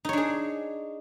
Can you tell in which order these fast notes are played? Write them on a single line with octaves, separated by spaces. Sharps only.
D#4 C#5 D4 G#4